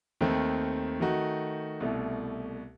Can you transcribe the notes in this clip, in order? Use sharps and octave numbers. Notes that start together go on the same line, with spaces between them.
D#2 D#3 A3 C4
D#3 A3 D#4 F#4
C2 B2 A3 E4